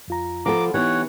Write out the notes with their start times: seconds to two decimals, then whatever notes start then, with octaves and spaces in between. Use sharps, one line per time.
0.08 F2 F4 A#5
0.46 F3 B3 A4 A#5 D6
0.74 E3 B3 D#4 G4 C#5 F#5